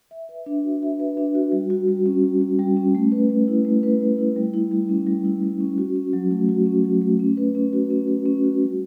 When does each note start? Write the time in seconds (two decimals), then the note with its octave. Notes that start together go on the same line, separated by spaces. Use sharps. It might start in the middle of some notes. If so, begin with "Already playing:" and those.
0.11 E5
0.29 B4
0.46 D4
0.64 F#4
0.82 E5
1.00 B4
1.17 D4
1.35 F#4
1.52 G3
1.70 F#4
1.88 G3
2.06 C#4
2.24 G3
2.41 F#4
2.59 G3
2.77 C#4
2.95 A3
3.12 B4
3.30 A3
3.48 E4
3.65 A3
3.83 B4
4.01 A3
4.18 E4
4.36 G3
4.54 E4
4.71 G3
4.89 C#4
5.06 G3
5.25 E4
5.42 G3
5.60 C#4
5.78 F#4
5.96 C#4
6.13 F#3
6.31 A3
6.49 F#4
6.66 C#4
6.84 F#3
7.02 A3
7.19 C#4
7.37 B4
7.55 C#4
7.73 F#4
7.90 C#4
8.07 B4
8.25 C#4
8.44 F#4
8.61 G3